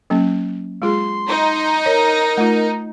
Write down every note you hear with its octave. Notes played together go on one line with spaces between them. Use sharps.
F#3 A#3 C#4
G#3 F4 G#4 C6
D#4
A#4 C#5
A3 F4